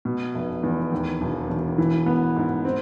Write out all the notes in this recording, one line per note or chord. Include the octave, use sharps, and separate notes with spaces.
B2
F1
E2
D#2
E1
E1
E3
B3
G#2
C4